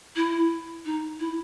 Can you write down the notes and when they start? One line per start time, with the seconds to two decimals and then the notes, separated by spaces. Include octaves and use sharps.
0.16 E4
0.85 D#4
1.20 E4